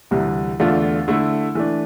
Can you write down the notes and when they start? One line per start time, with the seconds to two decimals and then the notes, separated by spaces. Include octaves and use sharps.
0.11 D2 C3 E3 G3
0.60 E2 D3 A3 D4 F4
1.08 D3 A3 E4
1.55 E3 A3 D4